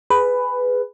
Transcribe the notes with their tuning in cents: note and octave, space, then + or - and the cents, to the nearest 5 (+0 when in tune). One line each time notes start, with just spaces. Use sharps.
G#4 +0 B4 +10